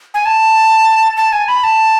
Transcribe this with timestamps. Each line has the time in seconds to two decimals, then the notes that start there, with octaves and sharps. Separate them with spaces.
0.14 G#5
0.26 A5
1.17 A5
1.33 G#5
1.48 B5
1.64 A5